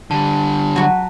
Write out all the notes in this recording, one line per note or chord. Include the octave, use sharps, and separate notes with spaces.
D3 G3 A5
F#3 F#4 B4